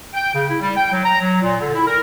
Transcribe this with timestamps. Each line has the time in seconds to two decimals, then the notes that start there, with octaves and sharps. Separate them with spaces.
0.14 G5
0.34 C#3
0.49 E4
0.61 G3
0.77 G5
0.92 F#3
1.05 A#5
1.21 F#3
1.42 A#2
1.61 D3
1.74 E4
1.87 A#4